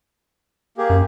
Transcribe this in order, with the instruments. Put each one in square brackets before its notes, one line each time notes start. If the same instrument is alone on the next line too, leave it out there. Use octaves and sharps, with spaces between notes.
[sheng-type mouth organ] A#3 G4 G#4
[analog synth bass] F#2